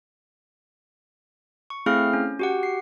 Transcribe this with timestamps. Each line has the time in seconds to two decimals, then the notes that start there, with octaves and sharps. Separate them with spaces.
1.70 C#6
1.86 A3 C4 E4 G#4 F5 F6
2.13 C#4
2.39 F#4 G4 F#5
2.63 C7